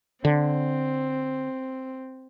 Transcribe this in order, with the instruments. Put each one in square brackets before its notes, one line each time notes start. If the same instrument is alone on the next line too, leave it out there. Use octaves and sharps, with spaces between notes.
[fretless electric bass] D3 [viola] C4